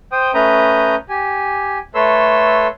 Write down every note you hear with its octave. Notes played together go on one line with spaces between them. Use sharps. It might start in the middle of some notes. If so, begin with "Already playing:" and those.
C5 G5 D#6
A3 C#4 B4 A#5 D#6 G6
G4 G#5
A3 A4 B4 C#5 C6 E6